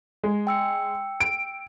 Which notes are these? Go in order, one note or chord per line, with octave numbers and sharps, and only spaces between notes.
G#3
G5 E6 C#7
D7